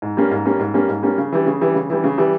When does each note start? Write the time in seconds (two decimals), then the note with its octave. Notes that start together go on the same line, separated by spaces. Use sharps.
0.02 G#2
0.17 G3 A#3 C#4
0.31 G#2
0.45 G3 A#3 C#4
0.60 G#2
0.74 G3 A#3 C#4
0.89 G#2
1.03 G3 A#3 C#4
1.18 C#3
1.32 E3 G3
1.46 C#3
1.61 E3 G3
1.74 C#3
1.90 E3 G3
2.04 C#3
2.18 E3 G3